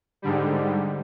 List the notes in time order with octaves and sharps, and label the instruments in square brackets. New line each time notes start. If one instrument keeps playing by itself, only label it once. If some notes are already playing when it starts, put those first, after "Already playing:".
[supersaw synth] G#2 D3 G3